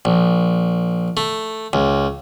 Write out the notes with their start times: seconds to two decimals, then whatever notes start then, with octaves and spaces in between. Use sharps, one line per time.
0.05 A#1
1.17 A3
1.73 C#2